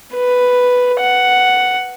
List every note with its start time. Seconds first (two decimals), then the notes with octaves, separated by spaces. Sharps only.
0.15 B4
1.00 F#5